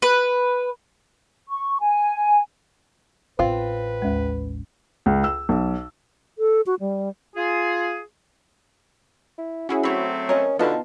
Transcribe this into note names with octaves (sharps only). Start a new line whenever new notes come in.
B4
C#6
G#5
A1 C4 F4 B4
D#2 G#3
C#2
E6
B1
A4
F#4
G3
F4 G#4
E4
C#4 E4 F#4 G#4
F#3 A3 C4 C#5 B5
C#4 A#4 C#5 D#5
B2 D3 B3 D#4 F4 A5